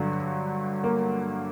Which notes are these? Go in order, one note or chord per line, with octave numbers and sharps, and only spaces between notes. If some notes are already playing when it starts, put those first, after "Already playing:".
Already playing: G2 D3 F#3 F#4
A#3